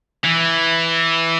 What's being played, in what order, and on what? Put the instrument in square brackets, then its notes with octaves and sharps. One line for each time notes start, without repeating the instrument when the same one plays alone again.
[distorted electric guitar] E3